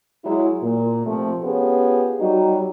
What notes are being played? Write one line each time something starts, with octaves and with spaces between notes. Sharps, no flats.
F#3 G#3 E4
A#2
C3 F3 A3
B3 C#4 F4 G4 G#4
F#3 G3 D#4 F#4 G4